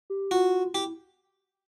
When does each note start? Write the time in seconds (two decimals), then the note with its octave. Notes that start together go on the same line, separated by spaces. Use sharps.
0.10 G4
0.31 F4 F#4
0.74 E4 G4